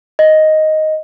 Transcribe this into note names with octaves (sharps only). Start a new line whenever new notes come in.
D#5